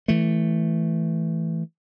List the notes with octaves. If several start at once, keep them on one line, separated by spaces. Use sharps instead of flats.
E3 A3